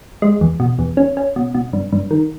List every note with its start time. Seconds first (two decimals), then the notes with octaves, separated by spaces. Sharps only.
0.22 G#3
0.41 E2
0.60 B2
0.79 E2
0.97 C#4
1.17 C#4
1.36 B2
1.55 B2
1.73 G2
1.92 G2
2.11 D#3